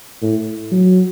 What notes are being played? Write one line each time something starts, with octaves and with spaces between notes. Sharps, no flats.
A2
F#3